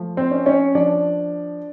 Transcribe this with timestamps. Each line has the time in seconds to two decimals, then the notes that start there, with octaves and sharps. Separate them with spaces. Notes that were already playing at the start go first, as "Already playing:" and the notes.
Already playing: F3 A3
0.17 C4 C5
0.31 C#4
0.46 C#4 C#5
0.75 F3 D4 D5